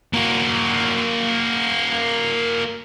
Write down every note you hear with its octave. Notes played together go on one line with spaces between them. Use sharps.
A#3 F#4